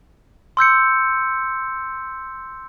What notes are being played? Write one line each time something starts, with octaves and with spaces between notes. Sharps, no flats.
C6 E6 G6 C#7